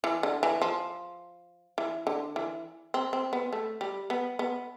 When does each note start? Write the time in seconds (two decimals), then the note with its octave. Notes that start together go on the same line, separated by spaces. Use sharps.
0.04 E3
0.23 D3
0.43 E3
0.62 F3
1.78 E3
2.07 D3
2.36 E3
2.94 C4
3.13 C4
3.33 B3
3.52 A3
3.81 G3
4.10 B3
4.39 B3